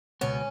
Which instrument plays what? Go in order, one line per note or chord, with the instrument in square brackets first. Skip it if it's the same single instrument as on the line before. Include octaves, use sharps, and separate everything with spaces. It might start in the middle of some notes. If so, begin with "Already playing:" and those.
[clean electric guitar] C#2 B2 B3 [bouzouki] C#4